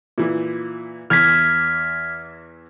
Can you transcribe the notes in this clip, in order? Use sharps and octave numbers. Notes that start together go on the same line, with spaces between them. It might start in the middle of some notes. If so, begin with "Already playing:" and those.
A#2 E3
E2 E3 F6 G#6 B6